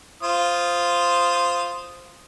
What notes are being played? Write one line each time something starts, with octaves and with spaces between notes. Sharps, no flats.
F4 C5 D#6